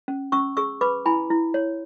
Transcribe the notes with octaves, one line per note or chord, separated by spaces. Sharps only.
C#4
C#4 C#6 E6
G#4 C#6 E6
B4 B5 D6
E4 G#5 B5
E4
C#5